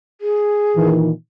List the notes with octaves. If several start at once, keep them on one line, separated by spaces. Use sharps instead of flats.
G#4
A#2 D#3 E3